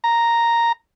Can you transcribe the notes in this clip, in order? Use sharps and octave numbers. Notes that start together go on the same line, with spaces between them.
A#5